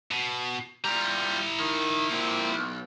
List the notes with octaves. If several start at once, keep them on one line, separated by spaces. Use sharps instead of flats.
B2
G3 E4 F4 A#5
D#3
A#2 C4
B1